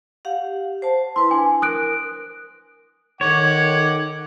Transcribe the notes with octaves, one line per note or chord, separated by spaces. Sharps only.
G4 F5 F#5
C5 A5
E4 B4 C6
D4 G#5
A#4 D#6 F#6 D7
D#3 C#5 F#5 D6